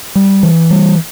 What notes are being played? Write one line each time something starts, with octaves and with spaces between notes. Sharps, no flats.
G3
E3
G3